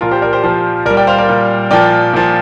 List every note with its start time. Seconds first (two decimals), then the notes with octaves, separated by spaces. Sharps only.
0.01 A#2 F3 F4 A#4
0.11 G4 C5
0.22 A#4 D5
0.33 G4 C5
0.43 A#2 F3 G4 C5
0.85 A#2 A#4 D5
0.90 G3
0.97 D5 G5
1.07 C5 F5
1.18 A#4 D5
1.29 A#2 G3
1.71 A#2 F3 D5 G5
2.13 A#2 F3